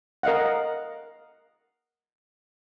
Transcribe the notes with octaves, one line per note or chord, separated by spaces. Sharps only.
A#4 D#5 F5 F#5